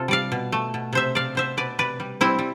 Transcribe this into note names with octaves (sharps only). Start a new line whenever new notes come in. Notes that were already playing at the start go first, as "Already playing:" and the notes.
Already playing: C3 F4 A4
G3 D5 F5
B2
A3
B2
C3 C5 E5
C3 D5 F5
B2 C5 E5
B2 B4 D5
C3 B4 D5
G3
G3 C4 E4
G3